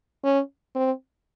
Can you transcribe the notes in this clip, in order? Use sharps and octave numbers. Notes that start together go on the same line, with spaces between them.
C#4
C4